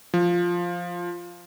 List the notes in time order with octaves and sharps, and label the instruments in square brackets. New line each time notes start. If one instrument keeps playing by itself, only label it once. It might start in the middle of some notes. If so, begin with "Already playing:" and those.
[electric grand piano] F3